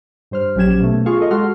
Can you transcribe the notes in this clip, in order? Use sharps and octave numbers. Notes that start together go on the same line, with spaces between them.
G2 C5 F6
A#1 F#3 C#4 G4 G#6 E7
B2 A3
F4 G#4 F5 C#6
F4 A4 D#5
G#3 F#4 A4 F#5 C6 F6